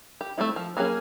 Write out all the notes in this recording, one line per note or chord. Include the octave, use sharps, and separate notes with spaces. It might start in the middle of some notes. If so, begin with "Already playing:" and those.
G4
A3 A#3 C4 E4
F3
F#3 A#3 C#4 G#4